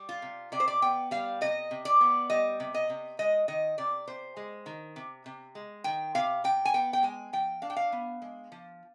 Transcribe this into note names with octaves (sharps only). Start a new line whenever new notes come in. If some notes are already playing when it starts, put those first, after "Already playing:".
Already playing: G3
F4
C3
C3 D5
C5
D5
B3 G5
G3 F5
C3 D#5
C3
D5
B3
G3 D#5
C3
D#5
C3
G#3 D#5
D#3 D#5
C3 D5
C3 C5
G#3
D#3
C3
C3
G#3
D#3 G5
C3 F5
C3 G5
G#5
B3 G5
G5
G#3 G#5
F3 G5
D4 F5
G5
F5
B3
G#3
F3